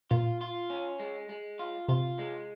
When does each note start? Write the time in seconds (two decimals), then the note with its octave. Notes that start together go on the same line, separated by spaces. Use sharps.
0.11 A#2 F4
0.41 F4
0.70 C#4
1.00 G#3
1.29 G#3
1.59 F4
1.89 C3 F4
2.19 G#3